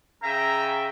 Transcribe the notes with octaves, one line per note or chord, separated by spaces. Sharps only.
C#3 E5 G5 A#5